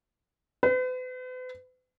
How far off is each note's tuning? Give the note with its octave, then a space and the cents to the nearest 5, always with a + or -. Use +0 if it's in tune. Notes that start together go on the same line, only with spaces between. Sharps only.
B4 +45